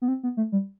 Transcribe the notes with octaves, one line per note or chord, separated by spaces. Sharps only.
B3
C4
B3
A3
G3